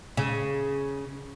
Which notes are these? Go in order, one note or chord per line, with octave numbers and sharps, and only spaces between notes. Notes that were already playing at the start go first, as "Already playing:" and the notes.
C#3